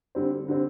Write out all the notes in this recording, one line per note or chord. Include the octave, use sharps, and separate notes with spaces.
D3 G3 C4
D3 G3 C4